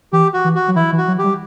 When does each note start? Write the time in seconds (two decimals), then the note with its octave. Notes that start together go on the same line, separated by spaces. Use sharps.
0.13 E3 G4
0.34 F#4
0.44 E3
0.55 F#4
0.68 F#3
0.76 E3 E4
0.92 E3
0.98 F#4
1.08 F#3
1.19 G4
1.24 G3